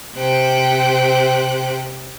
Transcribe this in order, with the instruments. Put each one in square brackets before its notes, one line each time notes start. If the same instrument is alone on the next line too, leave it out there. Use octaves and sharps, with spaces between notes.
[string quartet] C3 C5 G5 F#6